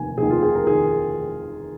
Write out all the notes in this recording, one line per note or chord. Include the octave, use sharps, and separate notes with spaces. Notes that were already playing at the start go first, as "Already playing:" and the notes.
Already playing: F1 D#2 D#3 G#5
F1 D#2 D#3 G#4
F4
G#4
A#4
D#3 G#4